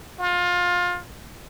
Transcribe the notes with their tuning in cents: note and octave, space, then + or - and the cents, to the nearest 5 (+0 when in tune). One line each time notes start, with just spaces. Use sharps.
F4 +25